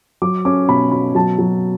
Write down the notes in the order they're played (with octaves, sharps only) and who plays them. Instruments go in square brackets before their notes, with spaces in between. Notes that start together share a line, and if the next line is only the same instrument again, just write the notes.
[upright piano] F#3 D6
C#4 D6
B2 B5
B2 B5
F#3 A5
F#3